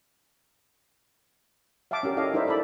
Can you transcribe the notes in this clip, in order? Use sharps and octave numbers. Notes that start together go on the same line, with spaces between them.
E5 F5 G5 A5 D6
C#4 F#4 G4 A#4
E4 A4 C#5 D#5 F5
D#4 E4 A#4 C5 D5 E5
E4 A4 D5 B5